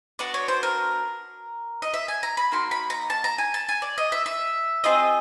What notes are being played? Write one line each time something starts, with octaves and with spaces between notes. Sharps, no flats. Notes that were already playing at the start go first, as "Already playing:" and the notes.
B3 D4 F#4 D5
C#5
C5
A#4
D#5
E5
G#5
A#5
B5
A#3 D#4 F#4 C6
B5
A#5
A5
A#5
G#5
A5
G#5
D5
D#5
E5
E5
C4 F4 G#4 D#5